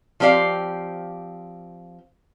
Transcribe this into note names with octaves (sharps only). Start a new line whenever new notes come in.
F3 C4 G4 D5 F5